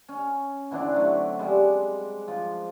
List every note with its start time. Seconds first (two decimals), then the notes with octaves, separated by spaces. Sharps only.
0.09 C#4
0.71 D3 E3 C4 D4
0.94 F#3 A3
1.39 G3 G#3
2.28 F3